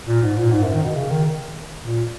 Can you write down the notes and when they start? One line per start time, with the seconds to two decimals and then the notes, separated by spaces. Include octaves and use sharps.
0.07 A#2
0.22 G#2
0.37 A#2
0.51 G#2
0.63 F#2
0.73 D#3
0.84 B2
0.95 C#3
1.10 D#3
1.84 A#2